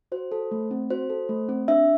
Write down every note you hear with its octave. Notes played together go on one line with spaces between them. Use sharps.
F#4 C5
A4
A3
C4
F#4 C5
A4
A3
C4
D4 E5